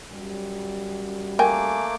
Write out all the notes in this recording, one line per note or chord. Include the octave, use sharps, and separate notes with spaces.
F#2 F#3 G3
A3 A#3 A#4 G5 G#5 D6